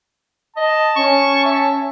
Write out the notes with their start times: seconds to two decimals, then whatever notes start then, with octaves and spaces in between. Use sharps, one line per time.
0.56 D#5 A5
0.96 C#4 C#6
1.45 E5